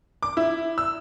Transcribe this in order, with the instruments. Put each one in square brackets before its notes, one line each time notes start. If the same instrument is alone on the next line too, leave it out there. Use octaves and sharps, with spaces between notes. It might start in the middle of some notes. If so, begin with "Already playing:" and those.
[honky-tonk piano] D6
E4
E6